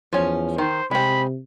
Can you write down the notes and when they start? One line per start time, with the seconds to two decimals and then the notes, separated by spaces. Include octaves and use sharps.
0.13 E2 F3 C#4
0.58 D#3 C5
0.91 C3 G#3 C4 B5